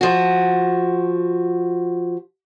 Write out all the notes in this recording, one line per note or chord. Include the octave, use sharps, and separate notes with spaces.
F3 F#4